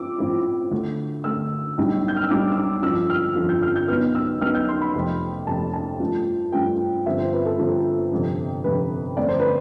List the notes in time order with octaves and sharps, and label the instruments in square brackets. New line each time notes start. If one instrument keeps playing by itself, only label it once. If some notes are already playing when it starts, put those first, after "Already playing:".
Already playing: [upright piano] F3 C4 E4 D6 E6
A2 F3 C4 E4
D2 D3 A3
D2 D3 A3 E6
B1 A2 G3 D4
G6
F6
E6
B1 A2 G3 D4 D6
E6
D6
G1 F2 D3 F3 E6
F6
G1 F2 D3 F3
G6
F6
G6
B1 B2 B3 F6
E6
B1 B2 B3 F6
G6
C6
B5
F1 F2 C3
F1 F2 C3 A5
A5
G2 F3 A3 D4
G2 F3 A3 D4 G5
G1 G2 F3 C4 E5
C5
B4
A4
G1 G2 F3 C4
G1 F2 C3
G1 F2 C3 B4
G1 F2 D3 A3 C4 D5
C5
B4